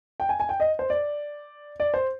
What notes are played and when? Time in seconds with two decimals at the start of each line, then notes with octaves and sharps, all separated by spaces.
0.20 G5
0.29 G#5
0.40 G#5
0.49 G5
0.60 D#5
0.79 C5
0.90 D5
1.80 D5
1.94 C5